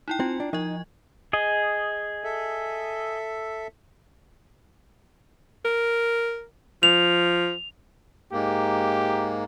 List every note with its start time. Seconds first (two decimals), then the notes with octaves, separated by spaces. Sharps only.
0.08 D#4 E4 G5
0.20 C4 F4
0.40 D4
0.53 F3 D#4 D#5
1.33 G#4 D#5
2.24 A4 E5
5.65 A#4
6.83 F3 F7
8.32 G#2 A#3 G4